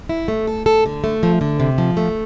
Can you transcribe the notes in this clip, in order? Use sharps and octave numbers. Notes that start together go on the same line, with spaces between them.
E4
A3
A4
A4
D3
A3
F3
D3
C3
F3
A3